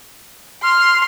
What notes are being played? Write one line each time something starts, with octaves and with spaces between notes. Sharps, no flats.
C6 F6